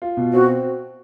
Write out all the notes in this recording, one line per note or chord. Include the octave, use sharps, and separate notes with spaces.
F4
B2
C4 F#4